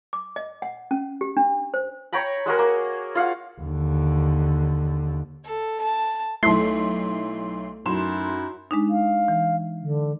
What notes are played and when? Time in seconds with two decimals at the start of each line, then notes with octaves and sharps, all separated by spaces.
0.13 D6
0.36 D#5
0.62 F#5
0.91 C#4
1.21 G4
1.37 D4
1.74 C5
2.13 C#5 G5 A#5 B5
2.46 G#3 F#4 G#4 A#4
2.59 A#3
3.15 F4 F5 F#5
3.61 D#2 D3
5.44 A4
5.81 A5
6.43 B1 A3 E4 C6
7.86 F#2 F#3 D#4 E4 C6 E7
8.71 G#3 D4 D#4
8.90 F5
9.28 E3
9.82 D3